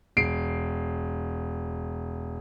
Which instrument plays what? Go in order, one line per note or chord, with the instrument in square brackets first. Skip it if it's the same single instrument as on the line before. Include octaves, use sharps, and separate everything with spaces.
[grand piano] E1 C7 D7